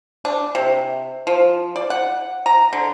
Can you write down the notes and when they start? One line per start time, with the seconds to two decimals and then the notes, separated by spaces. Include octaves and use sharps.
0.25 D4
0.55 C3
1.27 F3
1.76 D5
1.90 F#5
2.46 A#5
2.73 D3